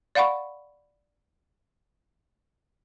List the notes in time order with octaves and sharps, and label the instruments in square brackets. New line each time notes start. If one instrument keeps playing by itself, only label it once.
[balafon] D5 F5 F#5 B5 C#6